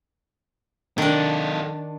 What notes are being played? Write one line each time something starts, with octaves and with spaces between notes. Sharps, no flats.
D#3 D4 D#4 A4